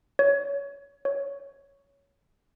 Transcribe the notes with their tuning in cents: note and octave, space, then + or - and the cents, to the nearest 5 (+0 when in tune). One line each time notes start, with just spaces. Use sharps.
C#5 +25
C#5 +5